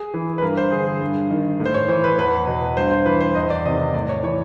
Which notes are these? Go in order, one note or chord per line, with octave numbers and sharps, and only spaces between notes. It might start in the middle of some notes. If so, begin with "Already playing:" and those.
Already playing: G#4
E3
B4
G2 A#4
C5
D3 G#4
G#4
G2
D#3
A2
C5
C#5
E3 C5
B4
E2 B4
B2
G2 C5
C5
E3 B4
C5
E2 D#5
D5
C3 D#3 D#5
D#5
A2 D5
C#5
E3 C#5